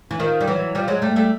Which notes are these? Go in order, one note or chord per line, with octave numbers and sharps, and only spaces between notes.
E3
D#3 F3
G3
E3 F#3
F3 G3
F#3 G#3
G3 A3
G3 A3